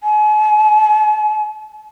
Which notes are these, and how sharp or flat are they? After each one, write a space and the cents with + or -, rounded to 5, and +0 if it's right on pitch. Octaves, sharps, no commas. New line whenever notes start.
G#5 +45